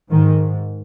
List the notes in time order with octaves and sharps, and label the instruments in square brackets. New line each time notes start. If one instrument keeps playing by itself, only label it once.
[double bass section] G#2 D#3